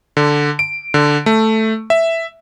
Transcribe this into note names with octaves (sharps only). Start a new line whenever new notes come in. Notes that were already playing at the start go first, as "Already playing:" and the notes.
D3
D7
D3
A3
E5